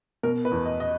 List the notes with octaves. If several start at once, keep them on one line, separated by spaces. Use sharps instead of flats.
B2 A#4
B4
E2
D#5
D#5